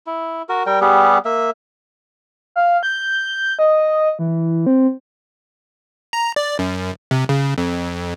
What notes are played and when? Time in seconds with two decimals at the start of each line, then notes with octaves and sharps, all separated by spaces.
0.07 E4
0.49 F#4 A#4
0.66 G3 A#4 G5
0.81 G3 B3 G4 G#4
1.25 A#3 E5
2.56 F5
2.83 G6
3.59 D#5
4.19 E3
4.66 C4
6.13 A#5
6.36 D5
6.59 F#2
7.11 C3
7.29 C#3
7.58 F2